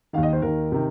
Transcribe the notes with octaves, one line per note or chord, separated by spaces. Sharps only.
D#2 D#3 F5
D#5
C5
D#2 D#3 A#4
C3 D#3